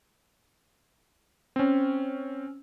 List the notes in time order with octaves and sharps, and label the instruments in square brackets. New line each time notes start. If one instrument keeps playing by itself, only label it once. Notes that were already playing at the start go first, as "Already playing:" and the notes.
[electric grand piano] C4 C#4